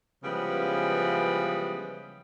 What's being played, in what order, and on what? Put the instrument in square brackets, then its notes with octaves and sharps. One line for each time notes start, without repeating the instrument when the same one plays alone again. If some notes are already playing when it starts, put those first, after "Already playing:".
[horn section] C#3 E3 F3 G3 G#3 B3